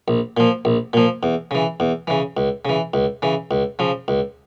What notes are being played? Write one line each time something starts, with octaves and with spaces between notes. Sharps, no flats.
A#1
A#2 F3
A#1
A#2 F3
E2
C#3 E3
E2
C#3 E3
C#2
C#3 E3
C#2
C#3 E3
C#2
C#3 F3
C#2